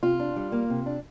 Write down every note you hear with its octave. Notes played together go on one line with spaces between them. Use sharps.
C3 F4
D4
G3
A#3
C3
D4